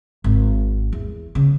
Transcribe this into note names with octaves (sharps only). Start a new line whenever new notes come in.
G#1
E2
C#3